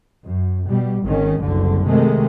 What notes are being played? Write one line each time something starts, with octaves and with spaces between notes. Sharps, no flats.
F#2
B2 G3
G#1 D#3 C#4
F#1 C2 D3
C3 D#3 G#3 A3